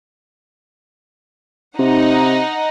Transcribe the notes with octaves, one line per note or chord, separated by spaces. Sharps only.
C3 D#4 F#5